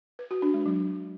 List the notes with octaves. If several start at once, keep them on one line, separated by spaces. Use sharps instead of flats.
B4
F#4
D4
G#3
F#3